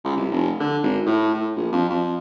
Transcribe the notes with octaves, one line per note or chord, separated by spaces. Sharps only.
C#2
C2
F1
D3
G#1
A2
A2
A#1
F2
F2